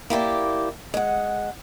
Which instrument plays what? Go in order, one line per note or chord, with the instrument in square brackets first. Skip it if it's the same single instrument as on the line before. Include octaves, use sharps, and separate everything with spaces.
[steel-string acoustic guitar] A#3 E4 G4 D5
G#3 F#5